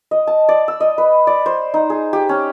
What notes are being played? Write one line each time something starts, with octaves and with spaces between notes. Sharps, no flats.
D#5
A5
D5
E6
D#5
B4
D5
C5
D#4
G#4
G4
C#4